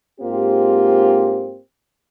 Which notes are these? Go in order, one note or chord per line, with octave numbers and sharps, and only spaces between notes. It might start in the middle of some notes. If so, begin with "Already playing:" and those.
G#2 A#3 C4 F4 G4